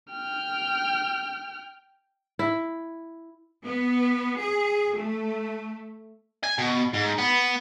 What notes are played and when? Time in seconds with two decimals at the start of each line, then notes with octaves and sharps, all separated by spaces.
0.12 G5 F6
2.39 E4
3.64 B3
4.39 G#4
4.95 A3
6.43 G#5
6.58 B2
6.93 G#2
7.18 B3